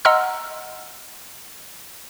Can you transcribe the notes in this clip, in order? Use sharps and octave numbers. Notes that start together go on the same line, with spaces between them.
D#5 F#5 A#5 C6 E6 F6